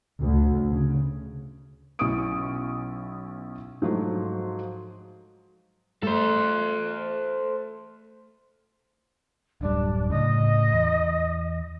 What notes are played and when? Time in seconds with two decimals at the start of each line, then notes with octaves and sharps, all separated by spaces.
0.21 D2
0.72 C#3
1.99 B1 C#4 E4 C#6 D#6 D7
3.82 G#2 F3 F#3 A3
6.03 A3 A4 C5
9.61 D1 F#2 G3 D4
10.10 A2 C#3 D#5
10.73 E2